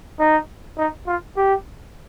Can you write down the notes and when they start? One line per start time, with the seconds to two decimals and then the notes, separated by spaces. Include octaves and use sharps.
0.19 D#4
0.78 D#4
1.07 F4
1.36 G4